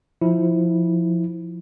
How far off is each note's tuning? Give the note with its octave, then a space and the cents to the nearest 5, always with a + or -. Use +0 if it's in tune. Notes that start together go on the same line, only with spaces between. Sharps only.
F3 +0 E4 -15